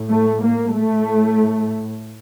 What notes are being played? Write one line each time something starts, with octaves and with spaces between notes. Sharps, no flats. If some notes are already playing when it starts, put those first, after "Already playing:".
Already playing: A2
A3
A#3
A2 A3